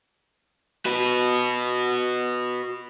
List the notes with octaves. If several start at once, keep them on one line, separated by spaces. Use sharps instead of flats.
F#4 B4